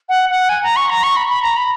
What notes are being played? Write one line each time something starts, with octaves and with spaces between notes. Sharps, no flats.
F#5
F#5
G#5
A#5
C#6
A#5
C#6
B5
B5
A#5
B5